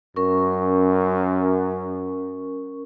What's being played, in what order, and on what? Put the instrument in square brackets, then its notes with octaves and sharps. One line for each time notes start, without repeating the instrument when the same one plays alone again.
[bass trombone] F#2 [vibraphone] C#4 A#4 C#6